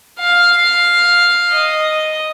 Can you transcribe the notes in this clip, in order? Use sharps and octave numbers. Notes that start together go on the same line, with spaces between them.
F5
D#5